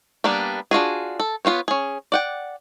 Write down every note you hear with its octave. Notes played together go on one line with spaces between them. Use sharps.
G3 A#3 B3 D4
D4 F4 F#4 G#4
A4
B3 F4 C5 C#5
C#4 G#4
D5 F#5 G5